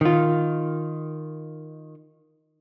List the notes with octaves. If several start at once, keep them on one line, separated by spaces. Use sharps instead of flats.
D#3 F4